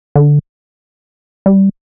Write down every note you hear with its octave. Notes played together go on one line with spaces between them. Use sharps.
D3
G3